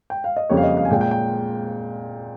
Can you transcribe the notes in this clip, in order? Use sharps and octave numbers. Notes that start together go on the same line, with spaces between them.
G5
F5
D#5
F2 C#3 G3 A#3 C#5
F5
D#5
F5
G#5
A#2 G#3 G5
G5
G5